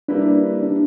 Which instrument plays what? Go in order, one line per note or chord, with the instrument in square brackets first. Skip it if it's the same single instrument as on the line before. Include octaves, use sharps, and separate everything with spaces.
[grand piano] G3 A#3 E4 B4 [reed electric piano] D4
[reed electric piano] D4